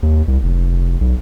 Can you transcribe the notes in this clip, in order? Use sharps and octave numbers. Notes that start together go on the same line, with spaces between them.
D#2
C2
F1
B1